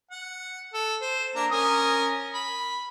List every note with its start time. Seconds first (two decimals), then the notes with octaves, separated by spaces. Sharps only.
0.11 F#5
0.74 A4
1.01 C5
1.36 A#3 D4 A#5
1.51 C#4 A#4 D#6
2.34 B5